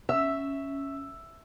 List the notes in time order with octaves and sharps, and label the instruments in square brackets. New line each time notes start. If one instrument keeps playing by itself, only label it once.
[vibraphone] C#4 [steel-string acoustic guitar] E5 [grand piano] E6